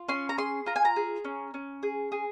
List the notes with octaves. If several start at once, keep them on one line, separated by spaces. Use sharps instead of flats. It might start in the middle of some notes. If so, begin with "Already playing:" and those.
Already playing: F4
C#4 C6
A#5
G#4 C6
F4 A#5
G#5
A#5
G#4
C#4
C#4
G#4
G#4